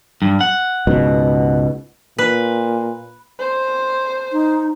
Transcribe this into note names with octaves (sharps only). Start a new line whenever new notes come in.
G2
F#5
C#2 G#2 B2
A#2 B4
C5
D#4